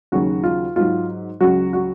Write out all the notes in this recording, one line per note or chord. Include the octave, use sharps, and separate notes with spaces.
D#2 C#3 F#3 F#4
F4
G#2 F#3 F4
C#2 C#3 F#3 F#4
F#4